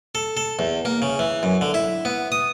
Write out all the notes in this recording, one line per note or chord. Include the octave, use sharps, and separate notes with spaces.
A4
A4
E2
A#3
C#3
E3
F#2
D3
E4
B3
D#6